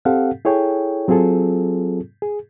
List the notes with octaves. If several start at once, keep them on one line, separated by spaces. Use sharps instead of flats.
C4 G4 A4 F5 F#5
E4 G#4 A4 C#5 G5
F#3 C4 F4 G#4 A4
G#4